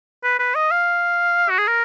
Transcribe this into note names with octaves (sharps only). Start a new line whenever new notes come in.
B4
B4
D#5
F5
F#4
G#4
A#4